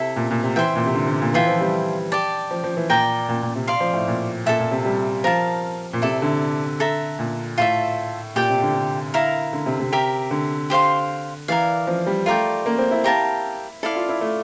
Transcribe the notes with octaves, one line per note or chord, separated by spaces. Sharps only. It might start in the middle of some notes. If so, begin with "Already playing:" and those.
Already playing: C3 E4 A4 E5
A#2
A#2
C3
E3 C5 E5 G5
A#2
C3
D3
D3
A#2
E3 F4 A4 E5 G5
F3
G3
G4 D5 A5
F3
F3
E3
A#2 A#4 D5 G5
A#2
A#2
C3
D5 F5 C6
F3
A2
A#2
A#2 A4 E5 A5
A#2
C3
G3
F3 A#4 F5 A5
A#2
C3 E4 A4 D5
D3
A4 E5 A#5
A#2
A2 F4 A4 E5
A#2 G4 D5 G5
C3
D3
D3
E4 A#4 F5 A#5
D3
C3
C3
G4 A#4 E5
D3
G4 C5 F5 C6
E3 A#4 D5 F5
F3
G3
A3 F4 A#4 D5 G5
A#3
C4
E4
G4 A#4 F5 A5
E4 A4 D5 F5
F4
E4
A3